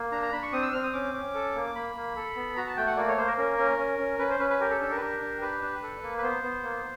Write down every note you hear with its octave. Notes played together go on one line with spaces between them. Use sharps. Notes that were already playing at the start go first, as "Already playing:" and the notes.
Already playing: A#3
D4 A#5
A#5
D4 B5
C#6
C4 D#6
E6
C4 F6
D#6
C#4 D6
C#4
A4
A#3
A#3 B5
A#3
A4
B3
F#4 A#5
A5
A3 G5
F#5
A#3 D5
C#5
A#3 C5
A#4
C#4 A#4
C#4
C#4
C#4
C#4 B4
C5
C#4 B4
B4
G4 A#4
A4
D4 A4
A#4
B4
G4 A#4
D4
G4 B4
D4
A4
A#3
B4
B3 C5
B3
A#3